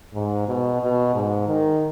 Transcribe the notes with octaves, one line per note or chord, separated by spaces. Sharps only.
G#2
B2
B2
G#2
D#3